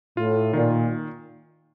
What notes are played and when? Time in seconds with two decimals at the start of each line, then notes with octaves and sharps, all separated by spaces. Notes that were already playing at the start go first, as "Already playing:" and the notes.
0.17 A2 F4
0.53 A#2 D#3